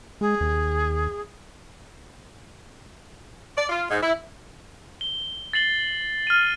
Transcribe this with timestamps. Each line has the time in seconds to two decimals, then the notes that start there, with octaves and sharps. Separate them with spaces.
0.21 G#3 G#4
0.41 D#2
3.56 D5
3.70 F4
3.88 G#2
4.01 E4
5.01 G7
5.53 A6 C7 F#7 G7
6.27 F6 D#7